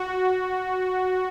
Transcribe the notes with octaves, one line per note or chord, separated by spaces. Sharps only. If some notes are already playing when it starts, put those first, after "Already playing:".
Already playing: F#4